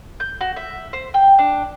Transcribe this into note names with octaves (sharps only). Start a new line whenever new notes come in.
G6
F#4
E5
C5
G5
D4